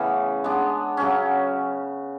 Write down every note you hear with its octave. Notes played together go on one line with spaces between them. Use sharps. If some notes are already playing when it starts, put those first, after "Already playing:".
Already playing: C#3 E3 A3 B3 C#4
G#3 B3 D4
C#3 F#3 C#4